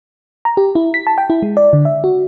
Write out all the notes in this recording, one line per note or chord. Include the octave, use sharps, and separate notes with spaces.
A#5
G4
E4
B6
A5
G5
E4
G#3
D5
D3
E5
F#4